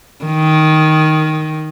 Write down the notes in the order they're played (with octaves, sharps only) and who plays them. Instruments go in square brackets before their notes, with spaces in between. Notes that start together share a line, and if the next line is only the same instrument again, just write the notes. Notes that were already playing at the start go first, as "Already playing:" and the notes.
[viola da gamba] D#3